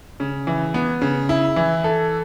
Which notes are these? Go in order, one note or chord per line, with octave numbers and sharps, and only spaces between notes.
C#3
E3
B3
C#3
E4
E3
A4